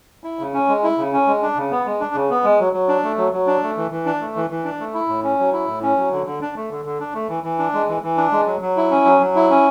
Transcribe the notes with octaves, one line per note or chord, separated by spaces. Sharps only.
E4
C#3
C#4
G#3
E4
C#3
C#4
G#3
D4
C#3
B3
G#3
D4
C#3
B3
G#3
F#3
F#3
D4
A3
F#3
F#3
D4
A3
E3
E3
D4
A3
E3
E3
D4
A3
E4
A2
C#4
F#3
E4
A2
C#4
F#3
D3
D3
D4
A3
D3
D3
D4
A3
E3
E3
D4
G#3
E3
E3
D4
G#3
F#3
F#3
E4
C#4
F#3
F#3
E4
C#4